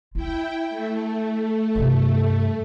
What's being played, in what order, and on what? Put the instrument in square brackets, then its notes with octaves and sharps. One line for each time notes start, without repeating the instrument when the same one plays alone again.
[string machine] E4 G5 [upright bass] F4
[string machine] A3
[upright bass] G2 C3